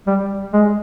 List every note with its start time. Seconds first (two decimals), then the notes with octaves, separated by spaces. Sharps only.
0.07 G3
0.53 G#3